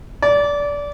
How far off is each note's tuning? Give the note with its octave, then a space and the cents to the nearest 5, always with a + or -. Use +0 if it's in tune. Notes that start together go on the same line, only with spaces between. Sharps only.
D5 -20